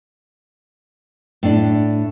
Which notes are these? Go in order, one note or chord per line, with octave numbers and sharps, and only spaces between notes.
A2 D4